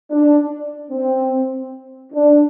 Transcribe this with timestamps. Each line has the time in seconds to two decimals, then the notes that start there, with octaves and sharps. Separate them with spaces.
0.11 D4
0.91 C4
2.13 D4